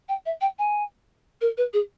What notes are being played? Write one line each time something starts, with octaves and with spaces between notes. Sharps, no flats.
G5
E5
G5
G#5
A#4
B4
G#4